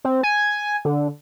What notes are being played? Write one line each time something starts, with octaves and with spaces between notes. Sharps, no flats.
C4
G#5
D3